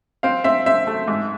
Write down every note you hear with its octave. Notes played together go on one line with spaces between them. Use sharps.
C4 F5
C4 E5
C4 E5
A3
G#2